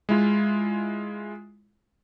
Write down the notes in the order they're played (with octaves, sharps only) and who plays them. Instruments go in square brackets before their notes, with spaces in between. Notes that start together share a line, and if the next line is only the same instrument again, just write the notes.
[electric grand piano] G#3 E4 F4